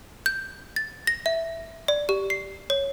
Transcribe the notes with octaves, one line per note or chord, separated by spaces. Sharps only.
G6
A6
A#6
E5
D5
G4
C7
C#5